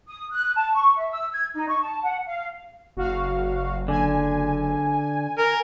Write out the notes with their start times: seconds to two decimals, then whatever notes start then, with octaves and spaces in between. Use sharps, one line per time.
0.07 D#6
0.32 F#6
0.55 A5
0.73 C#6
0.96 E5
1.10 E6
1.32 G#6
1.54 D#4
1.68 C#6
1.81 A5
2.02 F#5
2.26 F5
2.97 F#1 F#4 F5
3.88 D3 G#5
5.38 A#4